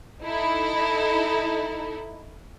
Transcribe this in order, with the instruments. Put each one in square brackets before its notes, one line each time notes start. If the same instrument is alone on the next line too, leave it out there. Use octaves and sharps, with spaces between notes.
[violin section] D#4 E4 A4